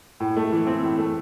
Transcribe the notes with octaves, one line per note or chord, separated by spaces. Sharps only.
A2
A3
E3
C4
A2
A3